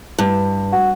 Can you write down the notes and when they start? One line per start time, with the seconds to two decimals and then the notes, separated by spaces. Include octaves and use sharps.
0.19 G2
0.72 F#4